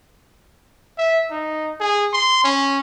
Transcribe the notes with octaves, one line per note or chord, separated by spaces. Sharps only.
E5
D#4
G#4
C6
C#4